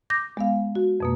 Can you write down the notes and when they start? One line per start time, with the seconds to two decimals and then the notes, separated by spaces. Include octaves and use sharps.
0.10 D6 G6 A#6
0.37 G#3 B3 F5
0.75 F#4
1.00 F2 B2 A#3